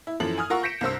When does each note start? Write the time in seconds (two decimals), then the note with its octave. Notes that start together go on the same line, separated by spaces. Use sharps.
0.07 E4
0.20 F#2 E3 F3 A4 F#7
0.38 G#5 D#6 F6
0.50 F4 A#4 F#5 C#6 E6
0.63 G6 A#6 B6 C#7 D7 E7
0.81 C2 G2 C5 E6